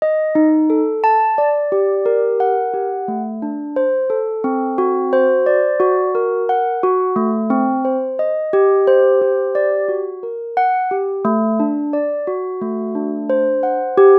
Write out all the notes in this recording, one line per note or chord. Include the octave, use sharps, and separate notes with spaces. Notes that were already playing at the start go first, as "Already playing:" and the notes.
D#5
D#4
A4
A5
D5
G4
A#4
F#5
G4
A3
D4
C5
A4
C4
F#4
C5
D5
F#4
A#4
F#5
F#4
A3
C4
C5
D#5
G4
C5
G4
D5
F#4
A#4
F#5
G4
A3
D4
D5
F#4
A3
D4
C5
F#5
G4